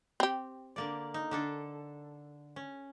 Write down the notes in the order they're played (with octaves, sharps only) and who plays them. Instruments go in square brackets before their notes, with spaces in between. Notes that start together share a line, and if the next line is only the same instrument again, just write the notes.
[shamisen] C4 G4
[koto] D3 A#3 D5
D#4
D3 D4 A4
C#4